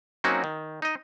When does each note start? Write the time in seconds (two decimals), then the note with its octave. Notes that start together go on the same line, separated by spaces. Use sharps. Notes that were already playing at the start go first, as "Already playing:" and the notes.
0.24 F#3 A#3 C4 C#4 D#4 F#4
0.44 D#3
0.82 D#4 D#5